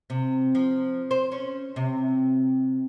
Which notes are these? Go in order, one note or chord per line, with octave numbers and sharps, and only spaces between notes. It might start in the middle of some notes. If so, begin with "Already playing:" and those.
C3
F3
C5
C#4
C3